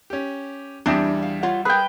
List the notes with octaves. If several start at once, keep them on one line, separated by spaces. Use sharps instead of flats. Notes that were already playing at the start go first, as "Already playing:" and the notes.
C#4 G4
E2 G3 C4 D4 E5 D#6 G6
F5
F4 C#5 F#5
G#4 A#4 B4 G5